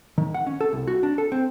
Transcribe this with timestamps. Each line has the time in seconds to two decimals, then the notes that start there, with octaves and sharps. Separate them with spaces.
0.18 D#3
0.34 F#5
0.47 C#4
0.61 A4
0.73 C2
0.87 F#4
1.03 D4
1.18 A4
1.32 C4